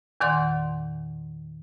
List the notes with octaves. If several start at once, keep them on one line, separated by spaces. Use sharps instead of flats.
E2 A#2 D#3 D5 F#5 C6